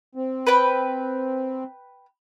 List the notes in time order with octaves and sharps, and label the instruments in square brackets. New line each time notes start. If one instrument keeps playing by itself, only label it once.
[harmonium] C4
[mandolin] B4 G5